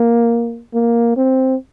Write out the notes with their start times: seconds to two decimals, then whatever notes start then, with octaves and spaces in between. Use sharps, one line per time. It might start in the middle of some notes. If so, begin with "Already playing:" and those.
Already playing: A#3
0.74 A#3
1.17 C4